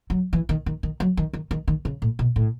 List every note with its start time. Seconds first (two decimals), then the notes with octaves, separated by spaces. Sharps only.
0.10 F#3
0.33 E3
0.49 D#3
0.66 D#3
0.83 D#3
1.00 F#3
1.17 D#3
1.33 D#3
1.51 D#3
1.68 D#3
1.85 C#3
2.02 A2
2.19 B2
2.36 A2